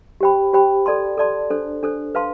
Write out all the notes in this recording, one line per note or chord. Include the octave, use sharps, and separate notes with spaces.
G4 C5 G5 B5
G4 C5 G5 B5
A4 D5 A5 C6
A4 D5 A5 C6
D4 A4 C5
D4 A4 C5
B4 F5 A5 C6